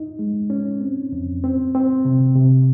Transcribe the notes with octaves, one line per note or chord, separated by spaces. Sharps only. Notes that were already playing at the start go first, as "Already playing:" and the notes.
Already playing: D#4
G#3
C#4
C4
F2
C4
C4
C3
C3